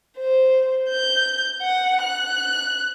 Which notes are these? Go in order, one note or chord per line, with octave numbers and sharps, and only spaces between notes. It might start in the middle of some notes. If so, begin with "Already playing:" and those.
C5
G6
F#5
F#6